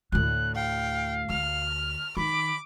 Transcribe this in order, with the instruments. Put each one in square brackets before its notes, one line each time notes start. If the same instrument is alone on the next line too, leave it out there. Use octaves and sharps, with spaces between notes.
[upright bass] D2 A2 [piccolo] F#6
[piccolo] F5 [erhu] G5
[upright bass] D2 [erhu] F6
[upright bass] D#3 [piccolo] B5 [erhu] D6